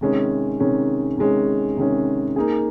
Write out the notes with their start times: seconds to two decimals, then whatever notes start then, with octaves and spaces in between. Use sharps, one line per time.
0.01 C3 D#3 G#3 C#4
0.60 C3 D#3 G#3 C#4
1.18 C3 D#3 G#3 C#4
1.77 C3 D#3 G#3 C#4
2.36 A#3 D#4 G#4